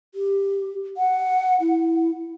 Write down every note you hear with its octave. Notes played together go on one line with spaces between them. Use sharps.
G4
F#5
E4